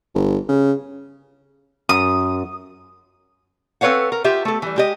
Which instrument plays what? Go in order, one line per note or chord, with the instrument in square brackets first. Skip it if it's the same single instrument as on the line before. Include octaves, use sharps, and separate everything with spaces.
[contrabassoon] G1
C#3
[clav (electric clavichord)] F#2 [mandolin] D#6
[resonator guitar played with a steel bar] C4 A4 B4 C#5 F5 F#5
A#4
F4 G4 E5
A3 A4
E3 G3
G#3 G4 D#5